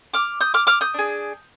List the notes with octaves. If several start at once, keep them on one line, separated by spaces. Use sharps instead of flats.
D6 F6
D#6 G6
D6 F6
D6 F6
D#6 G6
D4 G#4